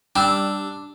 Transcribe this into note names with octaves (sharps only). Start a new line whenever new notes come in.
G3 D4 E6